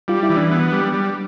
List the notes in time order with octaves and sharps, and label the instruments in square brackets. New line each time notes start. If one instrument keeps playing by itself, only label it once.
[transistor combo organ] G3 [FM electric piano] F4
[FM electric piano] E4
[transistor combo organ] E3
[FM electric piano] D4
[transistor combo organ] B3
G3
G3